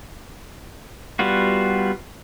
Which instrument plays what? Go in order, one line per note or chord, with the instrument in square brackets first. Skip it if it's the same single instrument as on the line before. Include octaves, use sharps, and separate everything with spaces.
[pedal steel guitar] G3 B3 F4 F#4